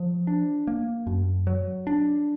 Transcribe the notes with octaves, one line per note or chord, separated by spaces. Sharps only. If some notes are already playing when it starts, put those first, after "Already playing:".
Already playing: F3
D4
A#3
F#2
F#3
D4